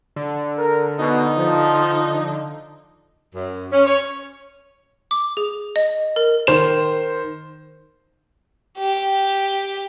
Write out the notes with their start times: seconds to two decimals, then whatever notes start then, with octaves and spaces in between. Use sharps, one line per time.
0.16 D3
0.58 A#4
0.99 B2 D#4
1.37 F3
3.35 F#2
3.72 C#4
3.86 C#5
5.11 D6
5.37 G#4
5.76 D#5
6.16 A#4
6.47 D#3 C5 E7
8.78 G4